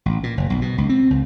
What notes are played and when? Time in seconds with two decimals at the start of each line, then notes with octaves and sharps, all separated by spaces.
0.06 A1
0.23 A#2
0.37 F#1
0.50 B1
0.62 B2
0.78 C#2
0.89 C4
1.10 C#2